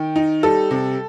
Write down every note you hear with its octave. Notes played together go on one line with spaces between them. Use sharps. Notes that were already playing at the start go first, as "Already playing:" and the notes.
Already playing: D#3 G5
D#4
G3 A4
C3